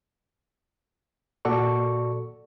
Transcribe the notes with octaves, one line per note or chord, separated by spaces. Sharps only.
A#2 F#4 A4 D5 C#6